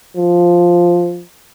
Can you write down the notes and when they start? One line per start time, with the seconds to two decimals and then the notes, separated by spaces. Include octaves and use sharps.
0.17 F3